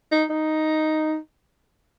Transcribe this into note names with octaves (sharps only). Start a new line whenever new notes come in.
D#4
D#4